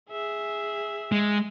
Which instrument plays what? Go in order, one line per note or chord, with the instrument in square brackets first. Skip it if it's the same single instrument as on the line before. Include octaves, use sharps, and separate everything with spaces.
[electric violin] G#4 E5
[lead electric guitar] G#3